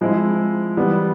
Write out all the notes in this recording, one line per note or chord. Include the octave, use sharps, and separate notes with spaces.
F3 G#3 C4 E4
E3 G3 B3